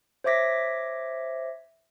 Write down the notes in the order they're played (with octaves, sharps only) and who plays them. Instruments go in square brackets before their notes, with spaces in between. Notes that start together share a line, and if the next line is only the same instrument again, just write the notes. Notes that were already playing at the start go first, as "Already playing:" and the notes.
[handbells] C5 C#5 E5 D6 A#6 B6